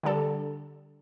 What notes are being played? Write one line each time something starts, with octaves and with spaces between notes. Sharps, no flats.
D3 G3 D4 A4